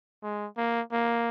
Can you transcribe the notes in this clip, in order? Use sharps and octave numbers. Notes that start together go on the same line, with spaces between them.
G#3
A#3
A#3